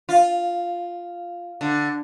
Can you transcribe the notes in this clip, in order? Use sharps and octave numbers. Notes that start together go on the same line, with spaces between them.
F4
D3